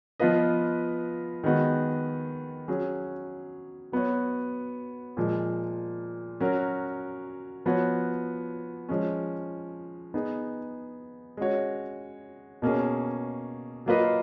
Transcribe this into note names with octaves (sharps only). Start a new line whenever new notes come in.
F3 B3 F4 B4 D#5
D#3 G#3 B3 F#4
F#3 C#4 G#4
F#3 B3 F#4 C#5
A#2 F3 G#3
F#3 C#4 F#4 A#4
F3 B3 F#4 C#5
F3 G#3 C#4
B3 D#4 G#4
G#3 C#4 F#4 C#5
B2 A#3 C#4 G#4
F#3 A#3 F4 B4 D#5